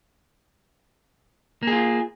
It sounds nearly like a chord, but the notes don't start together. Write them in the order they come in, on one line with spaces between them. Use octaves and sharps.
A#3 G#4 F4